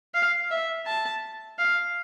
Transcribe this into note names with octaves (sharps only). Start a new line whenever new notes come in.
F5
E5
A5
F5